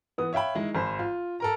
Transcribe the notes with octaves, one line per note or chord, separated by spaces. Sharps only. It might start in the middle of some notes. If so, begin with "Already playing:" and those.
E3 B3 D#6
C#5 E5 F5 G5 B5
D#3 G#3 E4
G#1 C5
F4
A4 A#4 A#5